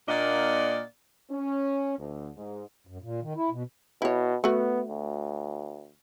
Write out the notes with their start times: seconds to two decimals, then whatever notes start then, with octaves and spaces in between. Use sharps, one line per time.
0.08 A#2 A#3 D4 D5 D#5 F#5
1.31 C#4
1.98 D2
2.37 G#2
2.87 F#2
3.02 A#2
3.22 D#3
3.37 E4
3.51 B2
4.02 B2 E4 C#5
4.44 A3 B3 F#4
4.89 D2